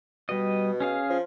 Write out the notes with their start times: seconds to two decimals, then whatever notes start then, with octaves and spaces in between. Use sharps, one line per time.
0.29 B2 G3 D#5
0.80 C#4 G#4 F5
1.09 F3